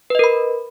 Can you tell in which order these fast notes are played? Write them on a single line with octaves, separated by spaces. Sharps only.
B4 D#5 A#4 B5